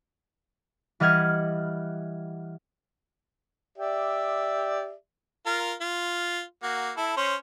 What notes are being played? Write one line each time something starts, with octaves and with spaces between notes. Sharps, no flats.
E3 G3 D#5 F#5 F6 G#6
G4 D5 E5
F4 A#4
F4
A#3 F#4
E4 A4
C#4 C5